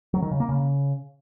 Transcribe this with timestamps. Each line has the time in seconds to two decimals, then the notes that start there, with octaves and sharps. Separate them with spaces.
0.14 F#3
0.22 D#3
0.31 C#3
0.40 A#3
0.49 C#3